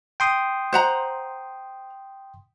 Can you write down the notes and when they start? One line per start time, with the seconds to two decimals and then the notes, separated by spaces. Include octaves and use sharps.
0.20 G5 C6 D#6
0.73 C5 F#5 A#5